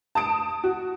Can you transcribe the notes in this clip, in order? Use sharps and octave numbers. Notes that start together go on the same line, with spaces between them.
A5 D#6 D7
F#4